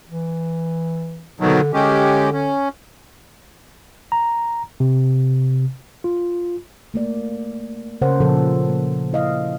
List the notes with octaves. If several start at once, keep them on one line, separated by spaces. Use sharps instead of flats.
E3
B2 D3 D#3 F#3
D3 G#3 C#4 G4
C#4
A#5
C3
F4
A3 A#3 D5
C#3 A#4 C5 C#5 F#5
A#2 C#3 F3 A4
A#3
E4 D#5 F5